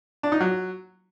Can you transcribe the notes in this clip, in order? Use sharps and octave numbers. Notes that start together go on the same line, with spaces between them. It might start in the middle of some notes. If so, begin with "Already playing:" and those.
D4
D#4
F#3